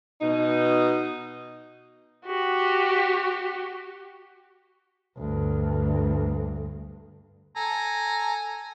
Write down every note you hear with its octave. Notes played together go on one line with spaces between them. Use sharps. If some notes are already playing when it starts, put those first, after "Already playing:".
B2 D#4
F#4 G4
D2 G2
A4 G#5 A#5